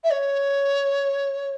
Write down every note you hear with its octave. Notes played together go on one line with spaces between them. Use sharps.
E5
C#5